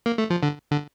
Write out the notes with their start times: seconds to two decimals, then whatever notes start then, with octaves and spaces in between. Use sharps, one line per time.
0.06 A#3
0.18 A3
0.30 F3
0.43 D3
0.71 D3